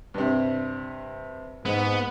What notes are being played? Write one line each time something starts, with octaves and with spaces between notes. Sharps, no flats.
G2 C3
G#2 B3